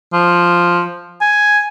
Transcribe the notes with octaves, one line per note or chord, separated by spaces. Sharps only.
F3
G#5